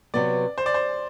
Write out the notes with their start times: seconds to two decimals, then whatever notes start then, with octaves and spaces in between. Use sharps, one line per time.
0.14 C3 F#3 B3 D5
0.58 C5
0.66 D5
0.74 C5